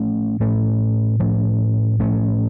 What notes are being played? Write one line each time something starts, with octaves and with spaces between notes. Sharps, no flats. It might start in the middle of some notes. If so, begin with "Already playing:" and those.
Already playing: A2 F3 A3 C#4
A2 F3 A3 C#4
A2 F3 A3 C#4
A2 F3 A3 C#4